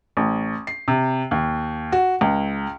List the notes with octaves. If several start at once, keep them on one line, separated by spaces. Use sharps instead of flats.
A1
C7
C3
D#2
F#4
C#2